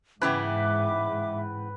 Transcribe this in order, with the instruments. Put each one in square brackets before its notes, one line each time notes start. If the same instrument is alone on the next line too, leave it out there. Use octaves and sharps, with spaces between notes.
[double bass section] G#2 [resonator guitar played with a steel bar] C#3 E3 B3 [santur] B4 G5 [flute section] E5 D6